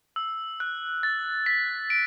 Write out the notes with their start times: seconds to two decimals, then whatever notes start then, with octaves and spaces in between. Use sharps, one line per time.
0.16 E6
0.60 F#6
1.03 A6
1.46 B6
1.90 D7